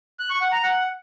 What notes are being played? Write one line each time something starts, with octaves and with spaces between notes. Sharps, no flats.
F#6
C#6
F#5
A#5
F#5